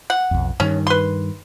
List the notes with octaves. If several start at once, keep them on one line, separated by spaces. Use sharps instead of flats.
F#5
B1 F2
G2 D#3 C#4
B4 C6